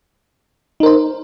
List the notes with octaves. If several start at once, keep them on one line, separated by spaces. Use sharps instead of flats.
D#4 A#4 C5